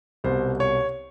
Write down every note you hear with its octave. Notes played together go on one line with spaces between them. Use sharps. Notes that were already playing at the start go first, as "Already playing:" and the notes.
C2 B2 C5
C#5